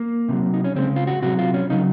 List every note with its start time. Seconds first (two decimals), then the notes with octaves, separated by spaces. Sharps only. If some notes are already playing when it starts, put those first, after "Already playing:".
Already playing: A#3
0.29 C3 D#3 F#3
0.54 D#4
0.64 C#4
0.75 C#3 G#3 C4
0.96 F4
1.07 F#4
1.22 C3 F#3 F#4
1.39 F4
1.54 C#4
1.70 C#3 F#3 D#4